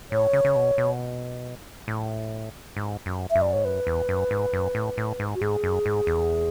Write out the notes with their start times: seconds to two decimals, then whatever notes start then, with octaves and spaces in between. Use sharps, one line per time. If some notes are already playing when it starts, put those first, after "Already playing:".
0.11 A2 C#5
0.33 C#3
0.45 C#3
0.56 B2
0.78 B2
1.88 A2
2.76 G#2
3.06 F#2
3.30 F#2 E5
3.42 D5
3.53 G#2 C#5
3.65 F#2 B4
3.87 E2
4.09 F#2
4.31 G#2
4.53 F#2
4.75 A2
4.97 A2
5.20 G#2
5.35 F#4
5.41 G#2 G#4
5.64 F#2
5.86 G#2
6.07 E2